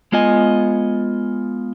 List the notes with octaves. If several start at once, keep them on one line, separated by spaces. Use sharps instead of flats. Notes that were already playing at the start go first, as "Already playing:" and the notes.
G#3 B3 F4 D#5 G#5